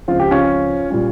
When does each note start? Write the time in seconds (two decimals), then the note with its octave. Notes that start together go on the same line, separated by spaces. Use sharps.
0.08 C#2 C#3 F3 C4 F4
0.20 G4
0.31 C#4 F4
0.90 A#2 G3 C#4